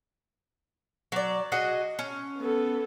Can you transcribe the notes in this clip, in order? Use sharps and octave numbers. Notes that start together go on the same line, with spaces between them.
F#3 D5
F#4 G#4 D#5
C#4
B3 A4